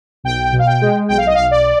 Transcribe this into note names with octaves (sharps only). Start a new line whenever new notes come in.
B1 G5
B2
F5
G5
G#3
B1 G5
F5
D#5
B1 F5
D5